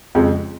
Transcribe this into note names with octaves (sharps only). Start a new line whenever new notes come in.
F2 C#3 F3 G#3